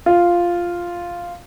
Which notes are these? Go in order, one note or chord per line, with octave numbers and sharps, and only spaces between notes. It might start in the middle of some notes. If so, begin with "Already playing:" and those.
F4